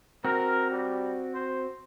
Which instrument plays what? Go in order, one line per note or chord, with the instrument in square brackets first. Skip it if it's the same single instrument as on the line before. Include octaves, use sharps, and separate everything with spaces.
[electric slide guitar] C4 F#4 [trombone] A#4
[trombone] G3
C5